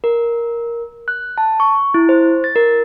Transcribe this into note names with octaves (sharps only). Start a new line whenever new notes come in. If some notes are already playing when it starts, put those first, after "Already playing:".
A#4
F#6
A5
C#6
E4
C5
A6
A#4